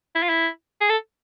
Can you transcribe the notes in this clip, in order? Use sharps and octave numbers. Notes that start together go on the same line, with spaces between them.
E4
F4
E4
G#4
A4